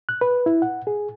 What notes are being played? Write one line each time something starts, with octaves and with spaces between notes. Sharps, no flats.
F#6
B4
E4
F#5
G#4